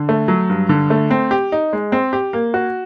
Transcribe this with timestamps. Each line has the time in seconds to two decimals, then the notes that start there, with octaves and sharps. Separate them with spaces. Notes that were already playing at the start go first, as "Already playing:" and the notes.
Already playing: D3
0.09 A3
0.28 F#3
0.50 G2
0.69 D3
0.90 A3
1.11 C4
1.31 G4
1.52 D#4
1.73 G#3
1.92 C4
2.13 G4
2.33 A#3
2.54 F#4